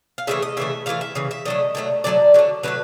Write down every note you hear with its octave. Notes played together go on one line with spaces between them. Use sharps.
F5
C#3 E3 A3 E5
D#5
C#3 E3 A3 E5
C#3 E3 A3 F5
E5
C#3 E3
E5
D3 F#3 A3 D#5
D3 F#3 A3
D3 F#3 A3 D5
D3 F#3 A3
D3 F#3 A3 B4